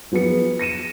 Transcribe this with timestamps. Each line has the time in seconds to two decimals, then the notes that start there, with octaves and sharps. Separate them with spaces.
0.12 F3 F#3 B3 G#4 C#7
0.59 A#6 C#7 D#7 E7